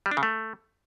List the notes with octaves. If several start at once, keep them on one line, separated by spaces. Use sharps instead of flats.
G3
D4
C#3
A3